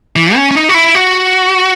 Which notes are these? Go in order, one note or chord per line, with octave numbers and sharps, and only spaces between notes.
E3
C#4
C#4
D#4
F#4
E4
F#4